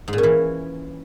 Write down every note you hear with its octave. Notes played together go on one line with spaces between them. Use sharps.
G#2
A#2
C#4
E3